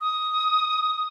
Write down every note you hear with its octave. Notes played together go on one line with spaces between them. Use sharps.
D#6